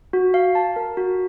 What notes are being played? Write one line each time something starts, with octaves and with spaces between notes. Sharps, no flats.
F#4
F5
A5
A#4
F#4